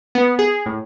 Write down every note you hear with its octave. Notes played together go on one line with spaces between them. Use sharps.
B3
G#4
A2